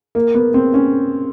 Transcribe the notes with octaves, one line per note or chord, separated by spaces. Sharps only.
A#3
B3
C4
C#4